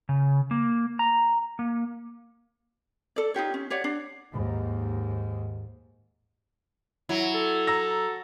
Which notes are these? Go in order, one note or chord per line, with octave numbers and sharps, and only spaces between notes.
C#3
A#3
A#5
A#3
A4 D5
D#4 F4 G4 C#5
C#4
G4 C#5 D5 F#5
D4
D#2 G#2
F#3 E4
A4
A#5 E6 A#6